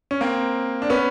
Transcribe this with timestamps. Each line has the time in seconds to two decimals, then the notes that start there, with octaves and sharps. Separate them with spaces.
0.11 C#4
0.21 A#3 C4
0.82 D4
0.90 B3 C#4